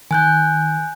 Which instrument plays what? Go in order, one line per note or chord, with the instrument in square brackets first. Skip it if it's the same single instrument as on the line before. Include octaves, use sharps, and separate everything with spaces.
[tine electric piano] D#3 [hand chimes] G#5 F#6 G6